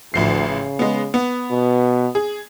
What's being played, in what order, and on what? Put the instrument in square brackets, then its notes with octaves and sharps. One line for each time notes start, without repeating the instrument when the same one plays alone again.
[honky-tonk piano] A1 F3 C7 [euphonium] D2
[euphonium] C#3
[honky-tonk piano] G#3 B3
B3
[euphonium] B2
[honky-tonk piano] G#4